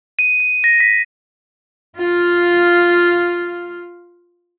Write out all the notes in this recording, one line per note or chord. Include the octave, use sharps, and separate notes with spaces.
D#7
D#7
A#6
B6
F4 F5